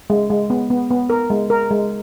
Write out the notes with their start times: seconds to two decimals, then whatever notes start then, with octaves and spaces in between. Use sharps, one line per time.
0.10 G#3
0.30 G#3
0.50 B3
0.70 B3
0.91 B3
1.10 A#4
1.30 G#3
1.50 A#4
1.70 G#3